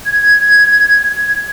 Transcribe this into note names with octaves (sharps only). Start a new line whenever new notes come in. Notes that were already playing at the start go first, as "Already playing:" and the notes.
G#6